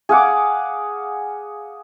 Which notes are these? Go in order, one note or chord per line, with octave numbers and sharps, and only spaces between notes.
G#4 F5 F#5 D6